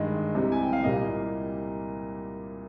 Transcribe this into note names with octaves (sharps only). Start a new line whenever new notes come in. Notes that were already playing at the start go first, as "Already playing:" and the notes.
Already playing: G2 D#3 G#3 D#5
C2 C3 G3
G#5
G5
F5
C2 A#2 G3 A#3 D#5